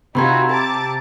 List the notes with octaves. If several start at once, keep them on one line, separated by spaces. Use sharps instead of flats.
C3 D#4 F4 F#4 B5 C6 G#6
A5 A#5 D6 A6